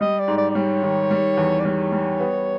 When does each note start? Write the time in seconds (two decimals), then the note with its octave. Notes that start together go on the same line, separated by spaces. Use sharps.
0.01 G3 D#5
0.19 D5
0.28 G#2
0.37 D5
0.51 D5
0.55 G3 C#5
0.83 D#3
1.11 G3
1.37 E2
1.60 D5
1.65 G3 C#5
1.92 G3
2.20 B3